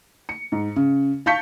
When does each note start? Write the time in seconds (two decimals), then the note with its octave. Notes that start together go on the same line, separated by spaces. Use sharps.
0.29 C#7
0.52 G#2
0.76 C#3
1.26 F5 A5 C#6 G6 B6 C#7